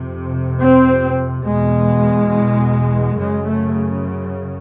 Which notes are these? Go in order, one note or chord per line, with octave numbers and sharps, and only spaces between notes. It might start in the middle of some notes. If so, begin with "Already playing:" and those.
Already playing: F2 C3
C4
E2 B2 G#3
F#2 C#3 G#3
A3